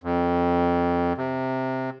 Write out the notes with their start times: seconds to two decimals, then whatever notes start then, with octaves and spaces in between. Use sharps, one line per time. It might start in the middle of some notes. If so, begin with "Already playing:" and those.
0.04 F2
1.18 C3